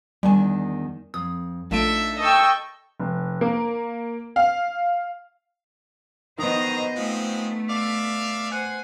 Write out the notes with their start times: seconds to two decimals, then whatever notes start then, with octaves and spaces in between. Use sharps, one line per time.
0.23 E2 D#3 G3 D4 G#5
1.14 F2 D#6
1.71 A#1 A3 D4 D#4 F4 A4 E5 D7
2.18 D#5 G5 A5 C#6 E6
2.99 F1
3.41 A#3
4.36 F5
6.38 D#3 F#3 B3 D#4 C5 D#5 A#5
6.96 F3 G#3 A3 C4
7.68 D5 E5 F5
8.51 C5 F#5 G#5